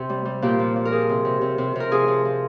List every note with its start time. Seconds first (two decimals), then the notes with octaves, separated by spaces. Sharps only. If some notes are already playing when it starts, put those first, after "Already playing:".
Already playing: C3
0.09 G3
0.25 G3
0.42 A#2 G4
0.59 F3
0.76 F3
0.85 A#4
0.92 F3 G#4
1.09 C3
1.25 C3
1.41 C3
1.58 C3
1.76 C3 A#4
1.91 F3 G#4
2.08 F3
2.25 F3